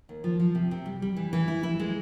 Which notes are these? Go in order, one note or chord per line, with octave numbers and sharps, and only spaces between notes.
D#2
F3
F3
C3
C3
G3
G3
E3
E3
E4
E4
G#3